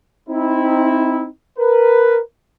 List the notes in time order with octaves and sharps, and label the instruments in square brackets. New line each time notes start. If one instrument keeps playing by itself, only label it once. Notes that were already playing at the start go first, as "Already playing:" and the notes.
[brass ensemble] C4 D#4 E4
A#4 B4